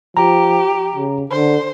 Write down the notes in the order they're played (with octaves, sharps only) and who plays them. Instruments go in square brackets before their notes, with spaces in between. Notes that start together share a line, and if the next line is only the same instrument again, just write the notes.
[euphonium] F3 [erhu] G4 [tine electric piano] A#5
[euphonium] C#3
[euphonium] D3 [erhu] C5